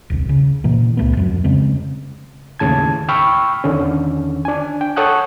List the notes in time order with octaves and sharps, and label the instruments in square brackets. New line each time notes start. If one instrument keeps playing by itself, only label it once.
[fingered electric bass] D#1 C2
C#3
A#2 E3 A#3
C#2 A3 B3
F2 F#3
C#3 G#3 C4
[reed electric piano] D#2 A2 C#3 A5 G#6
G5 B5 C#6 E6 F6
E2 D3 D#3 C#4
D4 G#5
G5
A4 C#5 F#5 D#6 F#6 G6